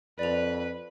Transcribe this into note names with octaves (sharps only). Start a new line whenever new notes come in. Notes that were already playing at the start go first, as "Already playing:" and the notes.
F2 B4 D5 F7